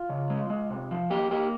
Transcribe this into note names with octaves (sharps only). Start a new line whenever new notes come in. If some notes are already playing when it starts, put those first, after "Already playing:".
Already playing: F4
C#3
G#3
G#3
C3
F3
A#3 G4
A#3 G4